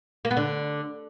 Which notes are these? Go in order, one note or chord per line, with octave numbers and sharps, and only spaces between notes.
A#3
B3
D3